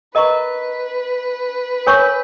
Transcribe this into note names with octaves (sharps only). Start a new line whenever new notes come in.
A#4 B4 D#5 A#5 C#6
A#4 C#5 G#5 C#6